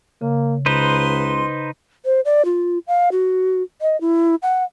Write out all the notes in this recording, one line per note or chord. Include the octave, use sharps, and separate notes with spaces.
C#3 A#3
C#2 D#4 B4 C5 C6
C5
D5
F4
F5
F#4
D#5
E4
F#5